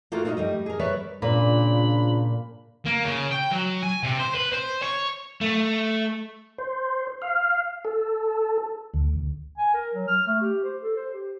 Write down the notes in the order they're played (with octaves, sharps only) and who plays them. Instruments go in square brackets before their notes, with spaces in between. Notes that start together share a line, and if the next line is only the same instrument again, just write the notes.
[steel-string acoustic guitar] A3 A#3 F4 F#4 A4 A#4
D#4 F#4 A#4 C#5 D#5 E5
G3 A3 D#5
G#4 A#4
G3 A#4 B4 C#5 D5 E5
[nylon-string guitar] A#2 A#3 [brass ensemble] C#3 F3 D4 [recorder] B5
[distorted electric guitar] A#3
C#3
G5
F#3
G#5
C3
C5
B4
C5
C#5
[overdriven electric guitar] A3
[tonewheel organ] C5
F5
A4
D2
[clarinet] G#5
A#4
F#3
F6
A3
G4
C5
A4
C5
G4